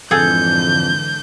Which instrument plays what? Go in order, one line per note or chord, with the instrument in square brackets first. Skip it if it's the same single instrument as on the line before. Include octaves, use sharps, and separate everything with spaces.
[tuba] F2 [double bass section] G#2 D3 E3 [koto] G#4 A4 [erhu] G6